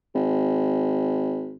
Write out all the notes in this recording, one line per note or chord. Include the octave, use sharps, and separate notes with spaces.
G#1